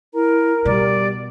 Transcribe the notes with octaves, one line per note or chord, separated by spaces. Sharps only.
E4 A#4 A#5
B2 G3 D5